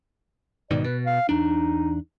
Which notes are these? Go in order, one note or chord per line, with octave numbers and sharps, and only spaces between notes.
G#2 B2 D#3 D5
B2 B4
F5
E2 D4 D#4